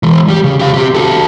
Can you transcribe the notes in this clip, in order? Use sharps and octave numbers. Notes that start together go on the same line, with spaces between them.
E3 G#3
G3 G4
C#3
G4 F5
C4 G4
F#4 A4